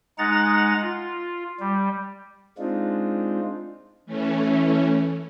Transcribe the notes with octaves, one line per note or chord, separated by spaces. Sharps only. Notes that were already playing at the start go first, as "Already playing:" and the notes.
G#3 D#4 F#5 A#5 A6
F4
G3
G#3 C4 D4 D#4 F4
E3 A3 C#4